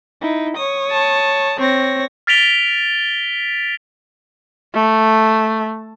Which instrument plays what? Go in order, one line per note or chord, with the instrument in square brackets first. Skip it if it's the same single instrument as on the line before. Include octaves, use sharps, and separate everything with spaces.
[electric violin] D#4 E4
C#5 D#6
[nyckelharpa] A5
[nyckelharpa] C4 [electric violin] C#5 A#6
[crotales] F6 A6 B6 D7 F7 G7
[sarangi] A3